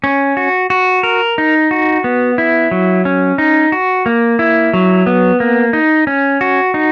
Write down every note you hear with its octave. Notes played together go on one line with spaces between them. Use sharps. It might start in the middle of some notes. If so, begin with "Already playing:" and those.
C#4
F#4
F#4
A#4
D#4
F#4
B3
E4
F#3
C#4
D#4
F#4
A#3
E4
F#3
B3
A#3
D#4
C#4
F#4
D#4